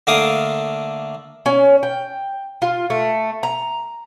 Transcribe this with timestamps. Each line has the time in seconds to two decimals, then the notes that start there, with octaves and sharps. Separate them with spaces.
0.07 D3 A3 A#3 F5 D6 D#6
1.46 C#4
1.83 G5
2.62 F4
2.90 A3
3.43 A#5